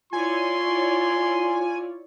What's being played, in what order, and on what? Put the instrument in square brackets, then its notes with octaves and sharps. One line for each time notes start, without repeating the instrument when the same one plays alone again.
[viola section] E4 C#5 D5 [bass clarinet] F4 [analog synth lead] G#5 [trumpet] C6